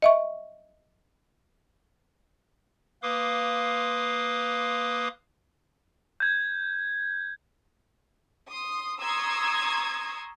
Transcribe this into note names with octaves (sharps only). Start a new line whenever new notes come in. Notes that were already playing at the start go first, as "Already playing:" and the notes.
D#5 E5 C#6
A#3 B4 F5 C6 D6 D#6
G6 G#6
C6 D#6
A#5 C6 C#6 D#6 E6 G#6